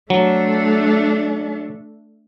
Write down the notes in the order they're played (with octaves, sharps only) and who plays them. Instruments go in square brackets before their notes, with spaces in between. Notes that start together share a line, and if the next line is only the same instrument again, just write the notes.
[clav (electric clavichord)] F#3 [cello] A3 D4